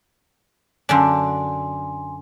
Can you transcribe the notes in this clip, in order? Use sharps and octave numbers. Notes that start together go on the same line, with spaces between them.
F#2 D3 D4 G#5 C6